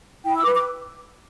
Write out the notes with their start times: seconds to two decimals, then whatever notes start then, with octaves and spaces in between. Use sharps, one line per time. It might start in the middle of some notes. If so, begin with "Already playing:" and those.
0.24 E4 G5
0.35 E6
0.44 B4 D6
0.54 D6